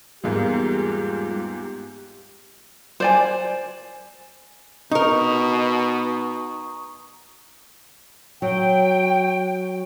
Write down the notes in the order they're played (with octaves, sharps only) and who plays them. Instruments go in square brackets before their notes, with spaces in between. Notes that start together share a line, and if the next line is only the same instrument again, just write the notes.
[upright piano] E2 G#2 A#3 [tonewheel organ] G3 G#3 F4 [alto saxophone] G4
[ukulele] C5 D5 G#5
[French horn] B2 [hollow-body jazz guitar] D#4 A#4 [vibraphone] A#5 C#6 D#6
[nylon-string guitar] F#3 [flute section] G5